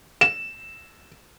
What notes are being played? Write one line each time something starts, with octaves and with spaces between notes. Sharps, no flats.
E7